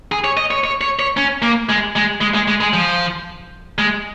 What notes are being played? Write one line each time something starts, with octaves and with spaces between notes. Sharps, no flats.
G#4
C#5
D#5
C#5
C#5
C#5
C#5
C#4
A#3
G#3
G#3
G#3
G#3
G#3
G#3
F3
G#3